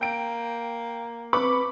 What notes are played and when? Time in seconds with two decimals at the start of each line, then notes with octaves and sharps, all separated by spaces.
0.01 A#3 G5 D7
1.33 C4 B4 B5 C#6 D6